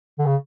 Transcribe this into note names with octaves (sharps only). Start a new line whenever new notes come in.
D3
C#3